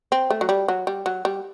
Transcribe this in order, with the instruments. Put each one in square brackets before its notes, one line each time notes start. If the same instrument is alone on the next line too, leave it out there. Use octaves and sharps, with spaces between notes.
[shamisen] C4
A3
F#3
G3
F#3
G3
F#3
G3